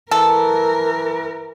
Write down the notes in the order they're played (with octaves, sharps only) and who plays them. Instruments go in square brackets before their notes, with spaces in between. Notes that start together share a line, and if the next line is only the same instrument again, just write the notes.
[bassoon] E3 [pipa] A4 [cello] A#4